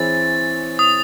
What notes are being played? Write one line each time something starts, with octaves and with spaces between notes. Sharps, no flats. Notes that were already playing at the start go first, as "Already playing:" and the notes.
Already playing: E3 C4 E4 G#4 C#5 A6
D#6